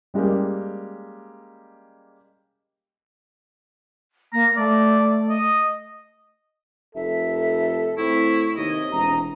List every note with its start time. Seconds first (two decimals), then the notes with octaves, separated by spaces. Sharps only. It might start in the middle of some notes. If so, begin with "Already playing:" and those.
0.14 G3 G#3 A#3 C#4 G4
4.33 A#3 A#5
4.56 A3 D5
5.29 D#5
6.95 F1 A4 E5
7.97 A2 C4 E4 C#6
8.57 D#2 C3 C#5 D#5
8.91 E1 A#5